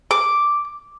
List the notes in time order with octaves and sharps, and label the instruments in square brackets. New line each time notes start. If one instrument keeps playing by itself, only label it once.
[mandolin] D6